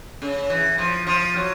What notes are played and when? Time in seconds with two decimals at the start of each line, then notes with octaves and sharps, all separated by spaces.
0.22 C#3
0.50 E3
0.78 F3
1.07 F3
1.36 F#3